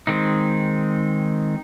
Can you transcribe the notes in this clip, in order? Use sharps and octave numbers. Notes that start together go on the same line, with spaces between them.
D#3 G#3 C4 D#4